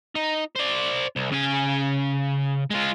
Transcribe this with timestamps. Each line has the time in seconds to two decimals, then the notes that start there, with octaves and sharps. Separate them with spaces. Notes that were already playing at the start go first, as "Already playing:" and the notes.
0.16 D#4
0.56 C5 D5
1.16 C2
1.32 C#3 G#5
2.71 G#3 F4